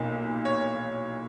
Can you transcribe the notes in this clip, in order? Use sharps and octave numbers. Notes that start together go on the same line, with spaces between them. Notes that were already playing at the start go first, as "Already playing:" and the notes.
Already playing: B1 A#2 A#3 D#4
C#5